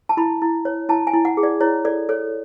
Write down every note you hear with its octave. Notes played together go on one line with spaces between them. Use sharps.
A5
E4 B5
E4
C#5
E4 A5
G#5
E4
F#5
G#4
D5
E4 C#5
A4 D5
A4 C#5